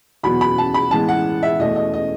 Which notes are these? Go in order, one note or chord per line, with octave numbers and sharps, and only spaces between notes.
E2 B2 F#3 B3 B5
B5
A5
B5
A2 E3 G#3 B3 A5
F#5
E5
E2 B2 A3 D#5
D#5
D#5